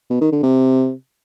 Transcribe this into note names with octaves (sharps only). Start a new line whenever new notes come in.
B2
D#3
D3
C3